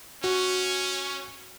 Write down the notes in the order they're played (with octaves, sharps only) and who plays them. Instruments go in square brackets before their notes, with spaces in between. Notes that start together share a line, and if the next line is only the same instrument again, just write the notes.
[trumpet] C#4 [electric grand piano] F#4